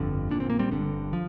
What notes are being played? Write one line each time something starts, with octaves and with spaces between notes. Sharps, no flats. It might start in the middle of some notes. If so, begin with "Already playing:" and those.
Already playing: G1 F2 D3
A#1 A#2 D4
C4
A#3
G3 C4
G1 G2 D3
F3